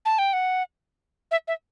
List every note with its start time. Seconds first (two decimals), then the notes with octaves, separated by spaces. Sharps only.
0.05 A5
0.18 G5
0.33 F#5
1.31 E5
1.48 E5